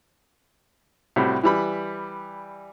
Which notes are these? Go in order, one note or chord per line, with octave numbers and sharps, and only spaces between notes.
A2 C3 G3 F#4
E3 G3 B5